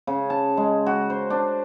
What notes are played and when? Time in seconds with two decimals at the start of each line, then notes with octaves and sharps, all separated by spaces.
0.07 C#3
0.30 A5
0.57 G#3
0.86 F#4
1.10 C5
1.30 D4